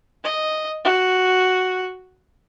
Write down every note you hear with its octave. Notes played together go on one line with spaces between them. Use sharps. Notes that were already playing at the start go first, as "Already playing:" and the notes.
D#5
F#4